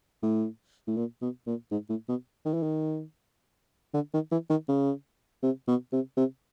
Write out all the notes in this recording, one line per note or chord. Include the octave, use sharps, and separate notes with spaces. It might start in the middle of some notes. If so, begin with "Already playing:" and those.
A2
A2
A#2
B2
A#2
G#2
A2
B2
D#3
E3
D#3
D3
D#3
E3
D#3
C#3
C3
B2
C3
C3